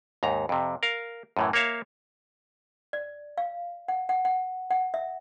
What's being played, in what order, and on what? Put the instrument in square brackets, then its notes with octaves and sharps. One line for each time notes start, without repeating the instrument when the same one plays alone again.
[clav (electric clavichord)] D#2 G#2 A#5
F2 C3
A#4 F5
F#2 A2 E3
A#3 A#4 C#5 E5 F5
[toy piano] D5
F5
F#5
F#5
F#5
F#5
E5